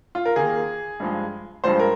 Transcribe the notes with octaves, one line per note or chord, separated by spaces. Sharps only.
F4
A#4
D#2 D#3 A#3 G#4
G2 F3 G#3
G2 F3 G#3 C5
A#4